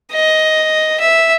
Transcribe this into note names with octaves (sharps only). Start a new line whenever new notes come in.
D#5
E5